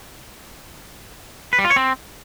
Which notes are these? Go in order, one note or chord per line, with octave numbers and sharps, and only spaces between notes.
B4
G3
F4
C#5
C4